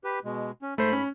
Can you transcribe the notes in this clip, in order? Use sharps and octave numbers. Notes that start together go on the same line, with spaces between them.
G4 B4
B2 G#3
C#4
G#2 A3 C5 B5
C#4